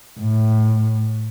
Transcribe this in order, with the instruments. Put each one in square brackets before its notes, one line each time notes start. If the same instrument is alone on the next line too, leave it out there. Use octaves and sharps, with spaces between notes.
[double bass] A2